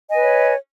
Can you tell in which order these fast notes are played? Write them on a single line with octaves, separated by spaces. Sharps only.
D#5 G#5 B4 C#5